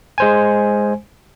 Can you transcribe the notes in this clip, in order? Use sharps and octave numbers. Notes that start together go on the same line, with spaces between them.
G#3 C5 G#5